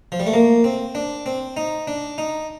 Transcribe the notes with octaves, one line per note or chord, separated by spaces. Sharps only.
F3
G3
A3
A#3
C4
D4
C4
D#4
D4
D#4